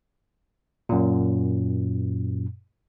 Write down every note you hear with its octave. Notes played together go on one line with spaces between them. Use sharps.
F#2 A#2